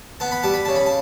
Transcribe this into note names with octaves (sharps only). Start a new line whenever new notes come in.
B3 A5
B5
G3 A5
B5
C#3 A5
B5
A5